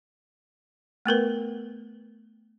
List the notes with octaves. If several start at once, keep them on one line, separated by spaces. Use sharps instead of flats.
A3 B3 A#4 B4